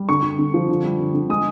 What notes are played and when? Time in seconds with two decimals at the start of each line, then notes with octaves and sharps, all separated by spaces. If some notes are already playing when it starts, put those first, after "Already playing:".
Already playing: G3
0.09 D3 C#6
0.23 D3
0.39 D3
0.54 F3
0.69 D3
0.84 G3
1.00 D3
1.14 D3
1.29 G#3 D#6